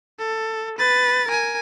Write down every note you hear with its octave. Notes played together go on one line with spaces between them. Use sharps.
A4
B4 A6
A#4 G#5